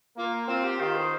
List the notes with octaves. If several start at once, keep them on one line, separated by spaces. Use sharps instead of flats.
A#3 F4
C4 F4
G4
D#3 F4
C5